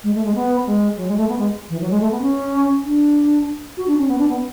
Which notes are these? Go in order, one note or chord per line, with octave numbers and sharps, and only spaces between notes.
G#3
A3
G#3
B3
G#3
F#3
G#3
A3
B3
G#3
E3
F#3
G#3
A3
B3
C#4
D4
F#4
D4
C#4
B3
D4
B3